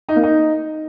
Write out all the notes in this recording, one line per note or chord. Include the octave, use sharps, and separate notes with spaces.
D#4
A#3
D#4